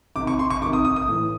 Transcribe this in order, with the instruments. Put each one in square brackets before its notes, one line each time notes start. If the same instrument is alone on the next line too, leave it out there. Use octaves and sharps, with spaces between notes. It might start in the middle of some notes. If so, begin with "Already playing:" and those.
[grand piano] C3 D#3 D6
C#6
C6
C#6
C3 D6
D#3
D#6
D#6
D#6
A2 E3